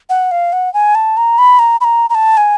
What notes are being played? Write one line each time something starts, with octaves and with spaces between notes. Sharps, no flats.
F#5
F5
F#5
G#5
A5
A#5
B5
A#5
B5
A#5
A#5
A5
G#5